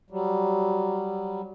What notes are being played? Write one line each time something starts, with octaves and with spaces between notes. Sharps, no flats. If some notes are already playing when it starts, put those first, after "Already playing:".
F#3 G3